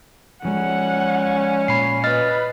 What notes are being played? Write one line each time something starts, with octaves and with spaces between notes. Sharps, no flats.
F3 G#3 C#4 F#5
A#2 B5 C7
B4 D#5 F6 A6